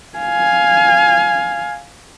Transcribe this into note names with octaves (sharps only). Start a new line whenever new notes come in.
F5 G#5